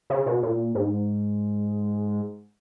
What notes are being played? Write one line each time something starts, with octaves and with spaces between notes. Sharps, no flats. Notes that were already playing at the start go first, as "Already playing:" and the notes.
C#3
B2
A#2
G#2